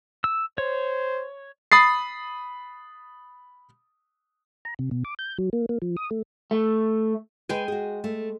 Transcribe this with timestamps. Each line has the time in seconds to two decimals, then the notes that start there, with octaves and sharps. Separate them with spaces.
0.24 E6
0.58 C5 C#5
1.72 B5 D#6 A6 C7
4.65 A#5
4.79 C3
4.91 B2
5.05 D6
5.19 G6
5.38 F#3
5.53 A#3
5.69 A#3
5.82 F3
5.97 D#6
6.11 A3
6.51 A3
7.49 G#3 B4 G5 G#5
7.68 F#4 G#4
8.04 A3